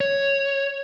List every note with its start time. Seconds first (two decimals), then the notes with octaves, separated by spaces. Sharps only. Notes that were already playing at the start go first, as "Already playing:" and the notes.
0.01 C#5